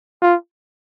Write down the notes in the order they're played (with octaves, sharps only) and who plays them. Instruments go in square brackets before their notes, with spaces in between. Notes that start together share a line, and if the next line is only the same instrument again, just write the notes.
[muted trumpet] F4